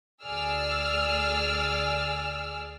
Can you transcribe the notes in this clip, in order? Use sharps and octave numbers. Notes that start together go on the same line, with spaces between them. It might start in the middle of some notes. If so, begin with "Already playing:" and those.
D2 G#4 D5 E6 F6